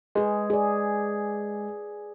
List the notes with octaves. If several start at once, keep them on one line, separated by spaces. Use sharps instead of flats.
G#3 G#4 B4
G#4 D5